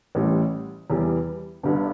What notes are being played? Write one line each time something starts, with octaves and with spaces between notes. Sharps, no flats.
A1 A2 G3
E2 E3 G3
G1 G2 D3